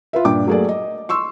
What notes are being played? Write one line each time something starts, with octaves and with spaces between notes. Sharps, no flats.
F4 B4 E5
G2 A#2 D4 G5 D6
F#3 A3 A#3 G#4 A4 D5
D#5
C6 C#6 E6